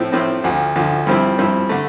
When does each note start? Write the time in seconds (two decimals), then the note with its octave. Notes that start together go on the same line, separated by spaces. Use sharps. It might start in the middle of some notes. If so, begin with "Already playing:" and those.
Already playing: A2 F3 C4 E4
0.12 A2 F3 C4 E4
0.44 D2 D3 F3
0.75 D2 D3 F3
1.07 G2 F3 C4 E4
1.38 G2 F3 C4 E4
1.69 D3 A3